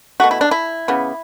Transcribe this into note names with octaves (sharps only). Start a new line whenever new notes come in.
B2 A3 F#4
E4
D4
E4
C#3 E3 B3